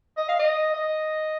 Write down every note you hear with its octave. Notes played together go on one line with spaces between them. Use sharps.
D#5
F5
D#5
D#5